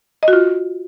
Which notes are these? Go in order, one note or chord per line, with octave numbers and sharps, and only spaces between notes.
D#5
F#4
F4